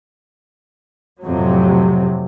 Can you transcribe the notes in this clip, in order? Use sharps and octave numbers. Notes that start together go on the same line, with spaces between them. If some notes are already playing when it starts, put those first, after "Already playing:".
F2 A2 C3 F#3